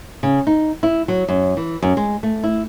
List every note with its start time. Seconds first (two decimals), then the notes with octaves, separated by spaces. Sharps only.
0.23 C#3
0.47 D#4
0.83 E4
1.08 F#3
1.28 F#2
1.57 E3
1.82 F#2
1.97 G#3
2.23 A3
2.44 E4